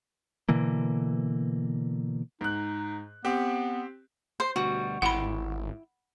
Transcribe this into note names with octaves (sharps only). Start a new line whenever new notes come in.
B2 D3 E3 A#3
G#2 D#4 F#6
B3 C4 G4
C5
D2 B2 G3 F#4
G#1 E4 F#5 G5 B5 C6